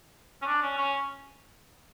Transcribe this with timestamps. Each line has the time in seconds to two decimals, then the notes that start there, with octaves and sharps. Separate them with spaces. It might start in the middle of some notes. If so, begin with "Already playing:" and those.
0.42 C#4
0.46 D4
0.62 C#4
0.77 C#4